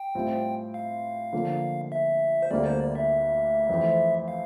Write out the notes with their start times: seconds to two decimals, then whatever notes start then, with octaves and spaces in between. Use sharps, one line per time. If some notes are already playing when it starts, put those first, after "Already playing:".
Already playing: G5
0.15 A2 G3 C4 F4
0.74 F5
1.33 D3 F3 A#3
1.92 E5
2.42 C5
2.51 D2 D3 G3 A#3 D5
2.66 C5
2.80 D5
2.95 E5
3.69 F2 E3 A3 C4
4.28 F5